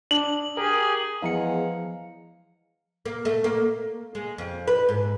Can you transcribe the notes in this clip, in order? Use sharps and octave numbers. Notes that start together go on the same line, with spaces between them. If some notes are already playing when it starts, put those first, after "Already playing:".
D4 F#7
G4 G#4 A#4
E2 F3 G#3 F5 A#5 C#7
A#3
A3
A#3
G#3
F2
B4
G#2